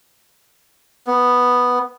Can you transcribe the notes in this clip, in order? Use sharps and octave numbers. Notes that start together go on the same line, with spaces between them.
B3